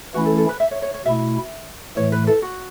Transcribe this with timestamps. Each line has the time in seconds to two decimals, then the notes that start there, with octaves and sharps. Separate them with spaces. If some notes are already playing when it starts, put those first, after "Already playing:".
0.14 E3 A3 C#4 E4 F#4
0.26 A4
0.37 A4
0.49 B4
0.60 E5
0.71 C#5
0.82 C#5
0.94 C#5
1.05 B2 A3 E4 E5
1.96 A2 E3 A3 C#5
2.12 B4
2.27 A4
2.42 F#4